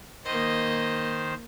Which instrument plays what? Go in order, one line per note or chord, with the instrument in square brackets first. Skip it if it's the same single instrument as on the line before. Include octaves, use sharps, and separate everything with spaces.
[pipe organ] D#3 C5 [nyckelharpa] A#3 D#5